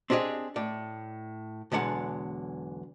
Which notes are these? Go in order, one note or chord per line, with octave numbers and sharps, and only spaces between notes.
C4 D4 G4 G#4 D#5
A2 D5
B1 E2 D3 G#3 F#5